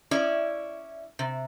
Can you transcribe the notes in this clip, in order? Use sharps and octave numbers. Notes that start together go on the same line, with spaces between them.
C#4 E4 D5
C3